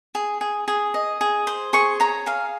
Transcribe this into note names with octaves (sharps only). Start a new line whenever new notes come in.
G#4
G#4
G#4
D#5
G#4
C5
G#4 C#6
C#5 A#5
G#4 F5